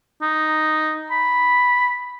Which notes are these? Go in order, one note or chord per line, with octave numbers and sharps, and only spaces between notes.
D#4
B5